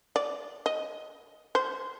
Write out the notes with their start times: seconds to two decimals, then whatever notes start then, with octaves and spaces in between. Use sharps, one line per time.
0.16 D5
0.66 D#5
1.55 C5